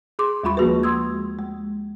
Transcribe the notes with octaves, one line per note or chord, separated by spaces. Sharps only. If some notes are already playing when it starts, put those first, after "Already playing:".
G#4 C6 D6
D#2 G3 G#3 F4 B5 C#6
F3 A#3 F#4 G#4 B4
G#3 C6 D#6 E6 G#6
G#3